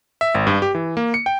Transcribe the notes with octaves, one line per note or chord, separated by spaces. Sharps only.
E5
G#1
G2
G4
E3
A#3
C#7
G5